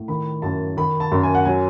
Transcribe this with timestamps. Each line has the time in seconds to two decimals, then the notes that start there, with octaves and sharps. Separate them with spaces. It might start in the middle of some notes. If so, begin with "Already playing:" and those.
Already playing: A2
0.08 D#3 B5
0.42 F#2 A5
0.77 D#3 B5
1.00 A5
1.12 F#2
1.23 G#5
1.35 F#5
1.45 F#3 G#5